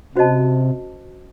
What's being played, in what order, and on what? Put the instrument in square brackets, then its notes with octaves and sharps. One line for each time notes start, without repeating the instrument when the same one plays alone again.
[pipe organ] C3 [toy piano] C#4 F#4 C5 D#5 A5